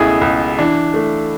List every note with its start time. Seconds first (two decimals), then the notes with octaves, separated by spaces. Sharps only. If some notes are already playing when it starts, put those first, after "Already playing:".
Already playing: C#2 B2 A3 E4 G#4
0.21 C#2
0.59 E3 D4
0.94 A3